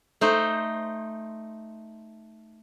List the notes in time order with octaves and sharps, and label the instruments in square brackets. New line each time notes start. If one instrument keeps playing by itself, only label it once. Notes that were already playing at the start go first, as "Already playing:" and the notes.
[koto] A3 D#4 C5